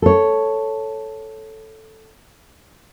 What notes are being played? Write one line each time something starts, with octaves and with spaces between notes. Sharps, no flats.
A4 C#5